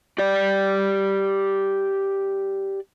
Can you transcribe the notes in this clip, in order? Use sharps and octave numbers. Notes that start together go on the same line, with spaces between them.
G4 D5